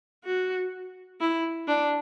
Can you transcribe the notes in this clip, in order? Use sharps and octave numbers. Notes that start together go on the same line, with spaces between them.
F#4
E4
D4